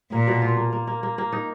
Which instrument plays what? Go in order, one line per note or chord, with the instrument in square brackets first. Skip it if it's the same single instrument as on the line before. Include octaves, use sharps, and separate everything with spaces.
[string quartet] A#2 [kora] A#3
[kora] B2
F4
A#3
A#3
A#3
A#3
A#3
D#4